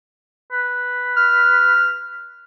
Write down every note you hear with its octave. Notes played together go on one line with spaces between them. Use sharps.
B4
F6